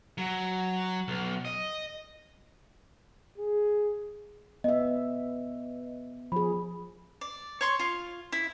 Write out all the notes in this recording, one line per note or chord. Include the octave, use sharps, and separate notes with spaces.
F#3
B1
D#5
G#4
B3 D#5 E5
F3 G#4 B5
D5
C#5 C6 C#6
F4
E4